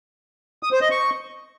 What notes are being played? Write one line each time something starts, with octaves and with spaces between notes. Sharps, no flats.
D#6
C5
D#5
C#6